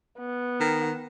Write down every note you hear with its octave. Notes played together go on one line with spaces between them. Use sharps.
B3
D#3